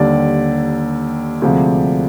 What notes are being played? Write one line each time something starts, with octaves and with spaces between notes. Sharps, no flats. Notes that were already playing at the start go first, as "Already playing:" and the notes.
Already playing: D#2 D3 G3 D5
D2 C3 F3 G#3